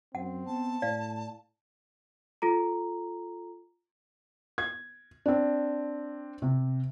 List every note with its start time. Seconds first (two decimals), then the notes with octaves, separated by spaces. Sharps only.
0.15 F#2 C4 F#5
0.47 B3 A5
0.82 A2 D5 F5
2.42 F4 A4 A#5
4.58 G#6
5.26 C4 D4
6.42 C3